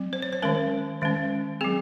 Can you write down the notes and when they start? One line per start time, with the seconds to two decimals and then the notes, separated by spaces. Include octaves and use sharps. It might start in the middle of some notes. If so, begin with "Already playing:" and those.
Already playing: F#3 C4
0.13 C5
0.22 C#5
0.33 C5
0.42 D#3 G#3 C#4 A#4
1.01 D#3 G#3 C#4
1.61 F#3 C4 G#4